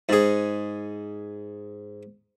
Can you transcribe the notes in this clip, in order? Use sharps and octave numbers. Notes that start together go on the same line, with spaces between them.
G#2 G#4